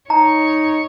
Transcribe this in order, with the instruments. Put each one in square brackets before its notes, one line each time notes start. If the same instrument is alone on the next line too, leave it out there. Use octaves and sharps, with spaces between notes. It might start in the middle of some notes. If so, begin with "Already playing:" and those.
[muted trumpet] D#4 [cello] C#5 [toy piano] A#5